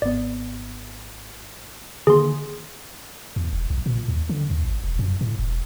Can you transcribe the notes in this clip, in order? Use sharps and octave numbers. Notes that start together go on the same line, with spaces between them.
G#1 B3 D5
D3 D#3 A#3 G#4 C6
E2
E1
B1
A#2
D#2
D3
D#2
G#1
E1
F#2
A2
E1